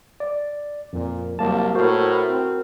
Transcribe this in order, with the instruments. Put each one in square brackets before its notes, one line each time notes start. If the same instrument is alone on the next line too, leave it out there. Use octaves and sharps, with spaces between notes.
[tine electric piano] D5
[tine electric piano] F2 [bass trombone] A#2
[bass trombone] C2 [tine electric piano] F#3 A#3 A5
[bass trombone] A2 [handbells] F#4 A#4 [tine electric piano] C5
[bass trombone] C4